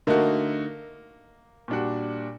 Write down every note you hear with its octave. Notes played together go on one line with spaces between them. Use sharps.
D3 A3 A#3 D#4 F#4
A#2 G3 D4 F#4